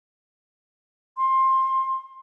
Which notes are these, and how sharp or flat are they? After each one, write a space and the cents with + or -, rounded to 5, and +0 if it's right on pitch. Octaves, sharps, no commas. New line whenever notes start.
C6 +20